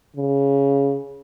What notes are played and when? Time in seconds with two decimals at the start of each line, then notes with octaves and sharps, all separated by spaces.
0.16 C#3